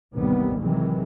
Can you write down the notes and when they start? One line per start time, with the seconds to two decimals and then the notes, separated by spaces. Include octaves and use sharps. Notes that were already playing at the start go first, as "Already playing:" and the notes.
0.14 A1 D#2 C3 D#3 G3 B3
0.59 C3 D#3 E3 F#3 G#3